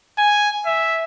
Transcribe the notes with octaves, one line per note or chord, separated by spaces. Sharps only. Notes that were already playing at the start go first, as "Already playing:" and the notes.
G#5
E5